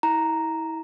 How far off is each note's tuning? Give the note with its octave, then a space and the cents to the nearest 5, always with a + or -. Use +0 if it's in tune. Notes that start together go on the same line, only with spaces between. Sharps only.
E4 -30 A#5 +0